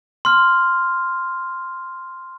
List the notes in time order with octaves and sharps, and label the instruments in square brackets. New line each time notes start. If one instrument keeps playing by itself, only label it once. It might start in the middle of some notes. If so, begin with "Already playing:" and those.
[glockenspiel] C6 F6